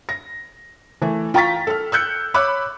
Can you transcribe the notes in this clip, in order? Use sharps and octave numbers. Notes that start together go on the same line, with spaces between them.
A#6
E3 A3
F4 G5 A#5 C#6 A6 B6
A4 F6
E6 F#6 G6 C#7
C#5 B5 D6 E6 F#6